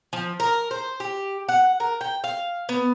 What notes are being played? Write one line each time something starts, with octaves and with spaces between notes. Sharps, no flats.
F3
A#4
C5
G4
F#5
A#4
G5
F5
B3